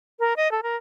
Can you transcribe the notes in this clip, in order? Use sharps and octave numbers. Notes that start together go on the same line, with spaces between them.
A#4
D#5
A4
A#4